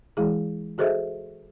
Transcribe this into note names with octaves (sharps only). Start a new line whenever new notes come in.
E3 G#3 E4 G#4
F#4 G#4 A4 C5 D#5 E5